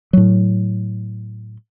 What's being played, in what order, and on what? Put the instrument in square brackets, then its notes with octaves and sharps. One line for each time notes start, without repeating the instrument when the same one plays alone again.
[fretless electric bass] A2 F#3